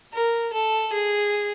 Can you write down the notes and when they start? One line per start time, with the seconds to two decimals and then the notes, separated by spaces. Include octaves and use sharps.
0.13 A#4
0.53 A4
0.92 G#4